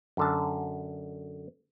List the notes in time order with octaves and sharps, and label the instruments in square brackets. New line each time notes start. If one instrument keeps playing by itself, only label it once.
[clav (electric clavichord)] F#2 D3 A5